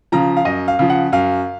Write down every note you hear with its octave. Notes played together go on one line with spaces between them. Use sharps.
C#3 F3 A#5
F5
F#2 D#5
F5
C#3 F3
F#5
F#2 F5